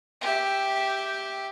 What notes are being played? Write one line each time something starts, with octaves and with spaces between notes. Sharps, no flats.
G4 E5